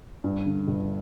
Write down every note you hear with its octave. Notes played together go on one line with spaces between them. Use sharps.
G2
D3
G1